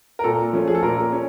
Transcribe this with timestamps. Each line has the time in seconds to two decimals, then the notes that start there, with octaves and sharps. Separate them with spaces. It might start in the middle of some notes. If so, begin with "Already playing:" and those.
0.19 A#4
0.24 A#2 A4
0.53 F3 A3 C#4
0.68 G#4
0.75 A4
0.83 A#2 A#4
1.12 C#4